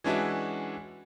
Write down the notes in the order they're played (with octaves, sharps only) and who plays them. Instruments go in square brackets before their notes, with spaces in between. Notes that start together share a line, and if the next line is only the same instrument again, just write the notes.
[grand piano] E3 G#3 C#4 D4 E4 F#4